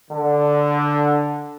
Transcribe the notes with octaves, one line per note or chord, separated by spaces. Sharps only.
D3